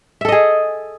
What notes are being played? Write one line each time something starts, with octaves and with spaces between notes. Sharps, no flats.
G#4 A4 D#5 E5